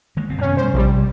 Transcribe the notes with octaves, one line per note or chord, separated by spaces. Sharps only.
D#3 G#3 A#3
F#1 B2 C4
F#2 C3 B3 C#4
B2 G3 A3 C5
A#1 C3 G3